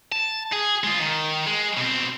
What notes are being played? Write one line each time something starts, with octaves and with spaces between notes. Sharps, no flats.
A5
G#4
G#3 F4
D#3
G#3
B2 C4